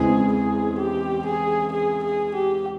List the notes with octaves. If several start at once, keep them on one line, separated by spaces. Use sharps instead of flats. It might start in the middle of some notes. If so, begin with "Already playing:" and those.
Already playing: E2 C#3 E3 G#3 C4 G#4
G#4
G4
G#4
G#4
G#4
G4